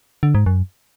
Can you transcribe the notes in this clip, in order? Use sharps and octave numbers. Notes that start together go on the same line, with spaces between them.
D3
G#2
F#2